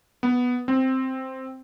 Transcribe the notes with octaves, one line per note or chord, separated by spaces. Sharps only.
B3
C4